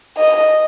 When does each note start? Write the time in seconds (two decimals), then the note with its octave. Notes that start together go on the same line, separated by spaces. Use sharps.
0.17 D#5